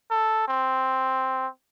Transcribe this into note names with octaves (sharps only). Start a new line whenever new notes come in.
A4
C4